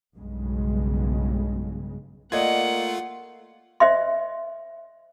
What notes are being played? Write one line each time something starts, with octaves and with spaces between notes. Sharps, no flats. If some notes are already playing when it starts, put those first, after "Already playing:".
B1 G2 C#3 G#3
A3 A#3 F4 D5 D#5 F#5 G#6
C5 D#5 E5 C6